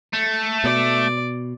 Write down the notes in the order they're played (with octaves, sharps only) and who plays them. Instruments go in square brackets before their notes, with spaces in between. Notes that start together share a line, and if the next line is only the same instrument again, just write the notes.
[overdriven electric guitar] A3
[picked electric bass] B2 [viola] D5